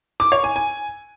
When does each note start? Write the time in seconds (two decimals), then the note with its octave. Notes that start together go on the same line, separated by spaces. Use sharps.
0.20 D6
0.32 C#5
0.44 G#5
0.56 G#5